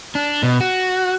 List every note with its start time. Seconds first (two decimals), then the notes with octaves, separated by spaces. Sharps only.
0.15 D4
0.43 B2
0.61 F#4